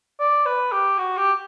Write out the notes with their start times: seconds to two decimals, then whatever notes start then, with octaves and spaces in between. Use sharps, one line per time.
0.20 D5
0.46 B4
0.72 G4
0.98 F#4
1.17 G4